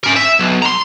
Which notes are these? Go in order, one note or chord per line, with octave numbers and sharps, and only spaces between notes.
C#4 A#4
E5
B1
A#5 C6